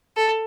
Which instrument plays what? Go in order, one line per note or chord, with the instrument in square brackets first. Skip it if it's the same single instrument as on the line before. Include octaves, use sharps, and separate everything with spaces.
[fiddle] A4